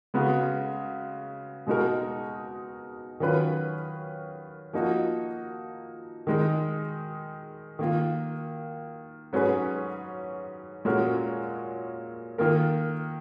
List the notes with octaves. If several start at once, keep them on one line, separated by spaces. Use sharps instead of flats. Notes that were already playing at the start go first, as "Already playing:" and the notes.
C#3 G#3 B3 F#4
B2 G#3 D#4 F#4 A#4
D#3 F#3 C#4 F4 B4
F3 A#3 D#4 F#4
D#3 G#3 D#4
D#3 A#3 F4
G#2 F#3 C#4 G#4 B4
A#2 G#3 C#4 F#4 A#4
D#3 A#3 F4 A#4